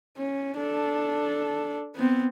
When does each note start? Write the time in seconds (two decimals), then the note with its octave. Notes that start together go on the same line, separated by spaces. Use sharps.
0.17 C#4
0.57 D4 A4
1.95 B3 C4